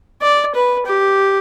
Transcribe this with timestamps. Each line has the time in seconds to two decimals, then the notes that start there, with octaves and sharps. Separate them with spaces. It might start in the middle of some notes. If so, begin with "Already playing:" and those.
0.22 D5
0.55 B4
0.86 G4